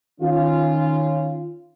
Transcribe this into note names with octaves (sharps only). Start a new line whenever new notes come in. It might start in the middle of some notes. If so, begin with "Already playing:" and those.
D#3 C#4 F4